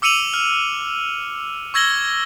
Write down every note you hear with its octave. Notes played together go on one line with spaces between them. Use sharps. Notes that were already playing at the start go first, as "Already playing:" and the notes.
D6 E6 C#7 D#7 F7 F#7
F6
C#6 E6 G#6 A#6 F#7 G7